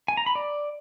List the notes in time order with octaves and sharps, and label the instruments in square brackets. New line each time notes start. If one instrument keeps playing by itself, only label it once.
[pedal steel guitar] G#5
A#5
B5
D5